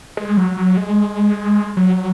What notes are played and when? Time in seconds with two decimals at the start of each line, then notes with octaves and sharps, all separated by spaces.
0.17 G#3
0.37 F#3
0.57 F#3
0.77 G#3
1.77 F#3